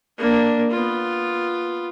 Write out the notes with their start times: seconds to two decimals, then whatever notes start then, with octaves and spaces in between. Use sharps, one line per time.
0.18 A#3 D4
0.70 B3 F4